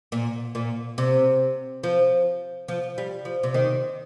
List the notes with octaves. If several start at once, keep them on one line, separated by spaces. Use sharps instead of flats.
A#2
A#2
C3
F3
F3
G3
F3
C3
D#3